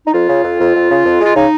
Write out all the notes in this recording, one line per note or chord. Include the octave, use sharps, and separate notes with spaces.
D#4
F2 F4
C#3
F2
F2
F2
C#3
F2
G#3 F4
C#3 D#4